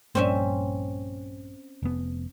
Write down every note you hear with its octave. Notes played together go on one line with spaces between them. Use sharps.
A#1 G2 A#3 C4 C#4 E5
F1 B3